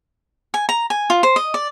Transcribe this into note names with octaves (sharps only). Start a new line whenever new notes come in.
G#5
A#5
G#5
F4
C5
D#5
D5